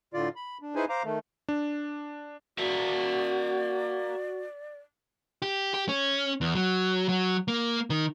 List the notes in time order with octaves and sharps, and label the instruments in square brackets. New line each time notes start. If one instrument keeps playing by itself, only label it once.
[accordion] A2 D3 F4 D5
B5
D4
D#4 E4 G#4 B4 C5 G#5
C5 F5 A#5 D6
D#3 A3
[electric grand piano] D4
[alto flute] F#4 [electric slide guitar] A#4 E5 F5 [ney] D5
[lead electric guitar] G4
G4
C#4
E2
F#3
F#3
A#3
D#3